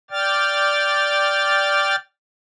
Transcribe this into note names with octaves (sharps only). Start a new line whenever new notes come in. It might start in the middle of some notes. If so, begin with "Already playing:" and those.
D5 G5 F6 A6